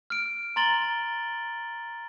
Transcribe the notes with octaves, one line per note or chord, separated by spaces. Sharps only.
F6 D7
A#5 C6 A6 F#7 G7